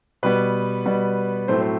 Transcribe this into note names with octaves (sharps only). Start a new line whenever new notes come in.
B2 G3 B3 B4
B2 G3 B3
A2 F#3 A3 C4 C5
C5